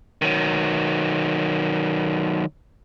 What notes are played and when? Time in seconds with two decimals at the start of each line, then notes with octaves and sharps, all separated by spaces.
0.22 D#3 F#3